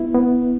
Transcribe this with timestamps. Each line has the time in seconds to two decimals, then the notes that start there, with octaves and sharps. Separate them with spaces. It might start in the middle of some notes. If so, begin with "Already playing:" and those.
Already playing: B3 E4
0.14 B3